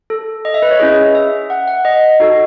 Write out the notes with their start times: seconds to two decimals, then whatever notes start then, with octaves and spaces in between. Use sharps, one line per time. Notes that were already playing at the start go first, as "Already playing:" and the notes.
0.10 A4
0.45 D#5
0.54 E5
0.62 B4
0.71 C#5
0.80 C#4 E4 G#4 D#5
1.15 E5
1.50 F#5
1.68 F#5
1.85 D#5
2.20 D#4 F#4 A4